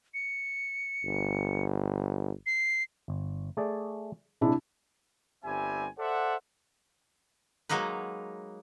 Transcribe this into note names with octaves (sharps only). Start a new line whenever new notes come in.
C#7
G1
C7
G1
A3 G#4 D5
C3 G#3 D4 E4
G1 G3 C4 E5 G#5
A4 C5 D5 E5 F#5
F#3 G#3 A#3 D#4 B4